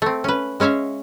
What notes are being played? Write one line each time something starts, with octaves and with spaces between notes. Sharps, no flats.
A3 C4
C#4 B4
G#3 C#4 C#5 E5 F5